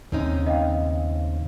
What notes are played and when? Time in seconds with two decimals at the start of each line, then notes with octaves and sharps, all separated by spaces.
0.12 D#2 A2 C#3 C4 C#4 D#4
0.47 D#5 F5 G5